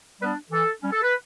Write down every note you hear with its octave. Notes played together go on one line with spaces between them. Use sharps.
G3 B3 D4 B4
E3 A4
G3 C#4
A4
B4